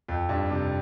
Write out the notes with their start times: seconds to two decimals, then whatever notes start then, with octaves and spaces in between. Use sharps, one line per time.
0.08 F2
0.29 G2
0.51 C3